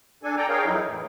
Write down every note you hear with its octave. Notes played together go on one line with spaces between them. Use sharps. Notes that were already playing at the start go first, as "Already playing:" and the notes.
D4 A4 G#5
A4 D5 G5 A#5
G#4 A#4 C#5 F5 G5
F2 F#3 D#4 E4
A2 E3